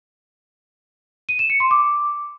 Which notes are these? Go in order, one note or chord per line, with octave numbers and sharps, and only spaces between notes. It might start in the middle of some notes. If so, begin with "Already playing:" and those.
D#7
E7
C#7
C6
D6